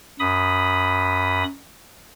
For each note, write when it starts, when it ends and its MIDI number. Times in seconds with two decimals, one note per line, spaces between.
0.20 1.44 42
0.20 1.44 83
0.20 1.44 87